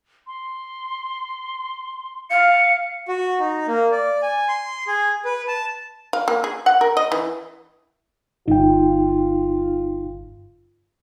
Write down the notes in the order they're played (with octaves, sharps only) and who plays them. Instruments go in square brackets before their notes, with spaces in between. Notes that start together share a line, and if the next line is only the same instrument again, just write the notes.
[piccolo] C6
[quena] F5 [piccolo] C#7
[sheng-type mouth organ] F#4
D#4
A#3
D5
G#5
C6
G#4
B4
A5
[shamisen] F5
A#3
G#4
F#5
A#4
D#5
E3
[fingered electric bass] G1 [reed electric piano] D#4 G5 [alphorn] F4